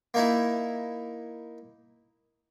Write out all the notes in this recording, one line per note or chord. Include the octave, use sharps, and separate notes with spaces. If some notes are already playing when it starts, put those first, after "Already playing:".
A#3 D#4 E4